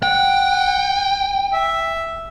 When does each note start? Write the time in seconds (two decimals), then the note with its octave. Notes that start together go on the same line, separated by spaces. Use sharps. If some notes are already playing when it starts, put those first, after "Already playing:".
0.03 F#5 G5
1.53 E5